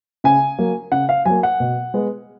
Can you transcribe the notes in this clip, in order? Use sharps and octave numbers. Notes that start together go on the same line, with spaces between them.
C#3 G#5
F#3 A#3
C#3 F#5
F5
F#3 A#3 G#5
F#5
B2
G#3 B3